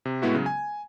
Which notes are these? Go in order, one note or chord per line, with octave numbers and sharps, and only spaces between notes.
C3
A2 G#3 B3 E4 F#4
C#3 F#3
G#5